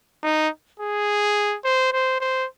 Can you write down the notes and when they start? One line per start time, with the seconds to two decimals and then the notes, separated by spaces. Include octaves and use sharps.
0.23 D#4
0.80 G#4
1.64 C5
1.92 C5
2.20 C5